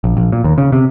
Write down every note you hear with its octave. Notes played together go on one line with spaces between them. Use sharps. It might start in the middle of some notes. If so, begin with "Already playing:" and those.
A#1
A#1
A#2
D#2
C#3
C3